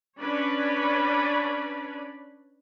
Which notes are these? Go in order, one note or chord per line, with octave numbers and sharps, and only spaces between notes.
C#4 D4 B4 C#5 D5 B5